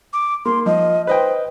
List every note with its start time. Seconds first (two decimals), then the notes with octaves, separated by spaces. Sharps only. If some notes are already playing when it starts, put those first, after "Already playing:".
0.13 D6
0.46 A#3 C6
0.66 F3 D#5
1.07 B4 C5 D#5 G5